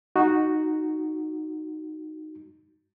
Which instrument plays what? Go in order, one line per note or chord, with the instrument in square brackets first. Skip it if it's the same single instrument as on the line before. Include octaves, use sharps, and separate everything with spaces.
[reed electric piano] D#4 F#4